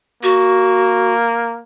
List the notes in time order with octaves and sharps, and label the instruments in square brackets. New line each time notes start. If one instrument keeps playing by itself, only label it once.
[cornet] A#3 [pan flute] F#4